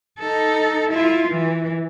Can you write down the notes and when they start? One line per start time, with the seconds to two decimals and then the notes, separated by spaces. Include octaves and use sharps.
0.19 D#4 A4
0.90 E4 F4
1.28 E3